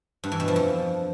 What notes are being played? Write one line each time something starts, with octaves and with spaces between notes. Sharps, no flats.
G2
E3
B2
F3
F2